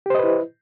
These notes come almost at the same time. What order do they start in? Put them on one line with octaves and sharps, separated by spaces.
G4 C5 D#5 B4 E4